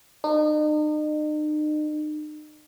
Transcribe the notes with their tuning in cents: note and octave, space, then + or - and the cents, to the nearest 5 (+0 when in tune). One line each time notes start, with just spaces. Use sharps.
D#4 -40